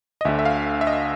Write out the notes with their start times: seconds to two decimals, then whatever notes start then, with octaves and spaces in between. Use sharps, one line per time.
0.21 D#5
0.25 D2 D3 E5
0.39 E5
0.45 F5
0.81 E5
0.87 D#5